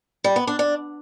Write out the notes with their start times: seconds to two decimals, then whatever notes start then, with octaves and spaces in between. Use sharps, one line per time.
0.24 G3
0.36 B3
0.47 D4
0.59 D4